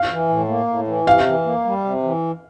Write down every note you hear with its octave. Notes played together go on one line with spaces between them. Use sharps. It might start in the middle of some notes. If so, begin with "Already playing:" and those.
Already playing: F5
E3
A2
A#3
A2
E3
C3 F5
E3
A#3
G3
C3
E3